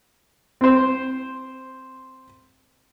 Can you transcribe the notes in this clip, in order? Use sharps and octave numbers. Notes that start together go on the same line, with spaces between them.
C4 C5